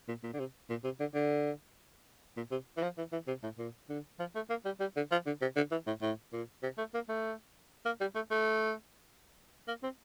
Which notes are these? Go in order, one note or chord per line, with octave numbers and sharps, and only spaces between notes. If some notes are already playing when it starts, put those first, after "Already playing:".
A#2
A#2
D3
C3
A#2
C3
D3
D3
A#2
C3
E3
F3
E3
E3
C3
A2
A#2
D3
F3
A3
A#3
G3
G3
D3
F3
D3
C3
D3
E3
A2
A2
A#2
C3
A3
A#3
A3
A#3
G3
A3
A3
A#3
C4